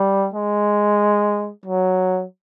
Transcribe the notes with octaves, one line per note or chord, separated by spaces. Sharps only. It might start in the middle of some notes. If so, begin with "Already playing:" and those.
Already playing: G3
G#3
F#3